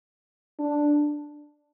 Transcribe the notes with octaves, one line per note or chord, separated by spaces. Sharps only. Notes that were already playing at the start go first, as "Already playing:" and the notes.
D4